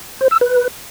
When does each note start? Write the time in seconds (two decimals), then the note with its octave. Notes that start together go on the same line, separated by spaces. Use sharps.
0.21 C5
0.31 E6
0.41 B4